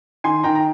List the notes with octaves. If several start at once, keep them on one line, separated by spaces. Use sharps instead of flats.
D#3 G#5 C6
D#3 G5 A#5
A#5